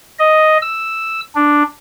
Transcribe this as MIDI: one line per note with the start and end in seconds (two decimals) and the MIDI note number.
0.19 0.57 75
0.62 1.20 88
1.35 1.63 62